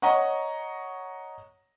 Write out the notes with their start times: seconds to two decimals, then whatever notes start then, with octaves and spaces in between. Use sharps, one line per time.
0.02 C#5 D#5 F#5 A#5 C#6